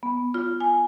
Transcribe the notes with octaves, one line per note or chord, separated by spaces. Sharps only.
B3
F4
G#5